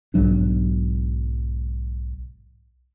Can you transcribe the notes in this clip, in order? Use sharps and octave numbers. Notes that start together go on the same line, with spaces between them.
B1 G#2 F#3 D4